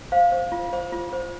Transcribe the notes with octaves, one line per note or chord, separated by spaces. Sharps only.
C5 F5
C5
F4
C5
F4
C5